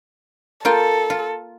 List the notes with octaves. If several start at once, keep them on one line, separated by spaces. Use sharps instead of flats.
A#3 F4 A4 G5
F4